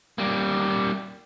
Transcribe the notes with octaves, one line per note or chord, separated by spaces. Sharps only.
G3 A#3